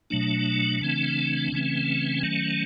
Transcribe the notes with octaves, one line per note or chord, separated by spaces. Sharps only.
B2 F#3 A3 D4
C#3 E3 A3 C4
C#3 E3 A3 C4 C#4
D#3 F#3 A3